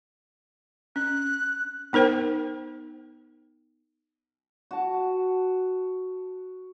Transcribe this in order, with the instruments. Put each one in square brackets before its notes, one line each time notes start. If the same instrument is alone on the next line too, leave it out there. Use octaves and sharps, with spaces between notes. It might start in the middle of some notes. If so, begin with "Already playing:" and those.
[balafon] C#4 [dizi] F#6
[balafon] B3 D#4 A#4 C5 G5
[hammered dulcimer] F#4 A5